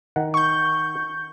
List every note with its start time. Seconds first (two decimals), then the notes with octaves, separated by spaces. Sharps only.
0.16 D#3 F#5
0.34 C#6 G6